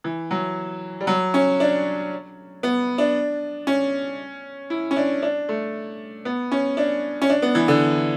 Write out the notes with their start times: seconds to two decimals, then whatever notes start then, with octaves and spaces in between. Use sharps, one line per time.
0.04 E3
0.31 F#3
1.00 G3
1.07 F#3
1.34 C#4
1.60 D4
2.63 B3
2.98 D4
3.67 C#4
4.70 E4
4.91 C#4
4.96 D4
5.23 D4
5.49 A3
6.25 B3
6.52 C#4
6.77 D4
7.22 C#4
7.30 D4
7.42 B3
7.55 E3
7.68 D3